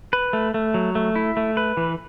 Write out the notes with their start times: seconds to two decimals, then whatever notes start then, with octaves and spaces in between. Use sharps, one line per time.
0.13 B4
0.33 A3
0.54 A3
0.74 F#3
0.95 A3
1.16 E4
1.37 A3
1.57 B4
1.77 E3